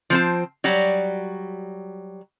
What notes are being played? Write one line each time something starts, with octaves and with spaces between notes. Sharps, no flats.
F3 C4 A5
F#3 G3 F#4